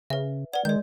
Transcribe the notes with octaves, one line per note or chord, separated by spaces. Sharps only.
C#3 B4 E5
B4 D5 F#5
D#3 G#3 D5 G6